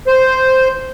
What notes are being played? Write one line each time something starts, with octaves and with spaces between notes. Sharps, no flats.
C5